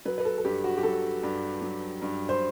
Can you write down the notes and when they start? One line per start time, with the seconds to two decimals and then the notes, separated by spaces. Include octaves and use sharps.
0.05 F#3 B4
0.18 B4
0.25 A4
0.38 A4
0.45 G2 G4
0.64 F#4
0.78 G4
0.83 F#3 A4
1.23 G2
1.61 F#3
2.02 G2
2.29 C5